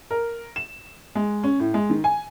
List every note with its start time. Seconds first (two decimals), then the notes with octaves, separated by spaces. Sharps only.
0.11 A#4
0.56 E7
1.15 G#3
1.43 C#4
1.60 A2
1.74 G#3
1.90 D#3
2.04 G#5